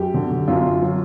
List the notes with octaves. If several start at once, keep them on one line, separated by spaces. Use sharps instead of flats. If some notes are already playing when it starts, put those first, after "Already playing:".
Already playing: F#2 G4
D3
F#2 F4
F#3